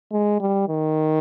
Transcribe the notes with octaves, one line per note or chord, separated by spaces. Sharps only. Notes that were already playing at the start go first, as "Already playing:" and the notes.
G#3
G3
D#3